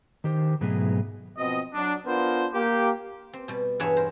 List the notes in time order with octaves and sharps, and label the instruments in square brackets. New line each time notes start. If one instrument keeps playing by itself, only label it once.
[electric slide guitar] D#3 G4 C5
G#2 B2 F#3 A3 B3 G#4
[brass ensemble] B2 F3 C4 D#5
F#3 D4
B3 D4 F4 A#4 C5
A#3 G4
[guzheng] C4
B2 G3
E2 G2 G#4 B4 C#5 E5
A#4 C5